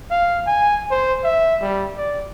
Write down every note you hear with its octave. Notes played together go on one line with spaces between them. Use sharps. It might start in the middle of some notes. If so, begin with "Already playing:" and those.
F5
G#5
C5
E5
G3
D5